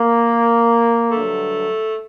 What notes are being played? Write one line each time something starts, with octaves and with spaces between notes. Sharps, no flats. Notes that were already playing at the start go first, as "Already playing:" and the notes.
Already playing: A#3
G2 D3 F#3 A3